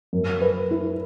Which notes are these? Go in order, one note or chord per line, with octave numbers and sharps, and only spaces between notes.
F#2
B4
E4